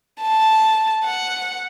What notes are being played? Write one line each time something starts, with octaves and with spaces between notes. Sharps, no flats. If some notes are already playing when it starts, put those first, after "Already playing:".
A5
F#5